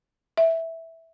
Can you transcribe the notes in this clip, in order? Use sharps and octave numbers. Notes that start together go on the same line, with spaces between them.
E5